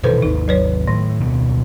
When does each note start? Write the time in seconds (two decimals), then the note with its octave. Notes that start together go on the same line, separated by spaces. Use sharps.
0.04 B2 D#3 E3 A4 B4 C5
0.22 G#1 D#2 D#4
0.48 F#3 B4 C#5
0.87 A2 D#3
1.21 D1 B2